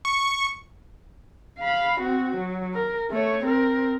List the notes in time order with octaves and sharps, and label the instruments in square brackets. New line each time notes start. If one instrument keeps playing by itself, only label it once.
[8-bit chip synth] C#6
[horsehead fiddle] F5 B5
C4 F#4
F#3
A#4
A3 C#5
C4 A#4